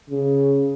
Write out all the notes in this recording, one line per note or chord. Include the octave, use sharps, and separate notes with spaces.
C#3